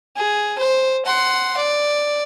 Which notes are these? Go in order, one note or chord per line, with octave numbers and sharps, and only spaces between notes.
G#4
C5
F#5 C6
D5